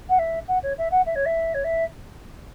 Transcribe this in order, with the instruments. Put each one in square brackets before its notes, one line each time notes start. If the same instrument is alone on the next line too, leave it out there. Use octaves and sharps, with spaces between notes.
[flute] F#5
E5
F#5
C#5
E5
F#5
E5
C#5
E5
C#5
E5